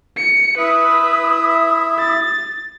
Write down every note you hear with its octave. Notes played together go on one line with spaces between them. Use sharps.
C#7
E4 B4 E5 D#6
A6